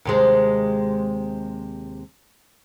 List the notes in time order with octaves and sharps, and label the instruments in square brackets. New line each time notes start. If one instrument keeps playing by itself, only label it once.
[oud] D#2 C3 G#3